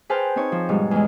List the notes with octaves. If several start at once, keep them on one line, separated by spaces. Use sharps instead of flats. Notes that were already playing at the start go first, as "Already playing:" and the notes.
G#4 B4 C5 G5 A5 F6
C4 D#4 C#5
F3
G#2 B2 G3
E2 G#3